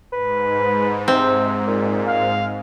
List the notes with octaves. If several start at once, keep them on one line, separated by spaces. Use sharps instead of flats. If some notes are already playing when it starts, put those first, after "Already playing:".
G#2 B4
C3 C4
A#2
F5